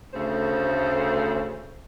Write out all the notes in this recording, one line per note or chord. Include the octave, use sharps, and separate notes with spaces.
D2 C#3 A3 C5